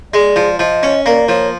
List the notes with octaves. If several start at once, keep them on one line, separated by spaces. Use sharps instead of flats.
G#3 D5
F3
F3 D#5
C#4
A#3 D5
F3 C#5